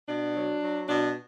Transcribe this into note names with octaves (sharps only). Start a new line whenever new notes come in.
B2 D4
F#3
F#3
B2 D4